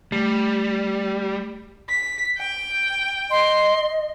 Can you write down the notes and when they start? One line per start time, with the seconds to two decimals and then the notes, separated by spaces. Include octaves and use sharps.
0.12 G3 A3
1.89 B6
2.38 G5
3.31 D#5 C6